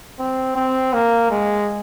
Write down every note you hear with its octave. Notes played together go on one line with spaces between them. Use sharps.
C4
C4
A#3
G#3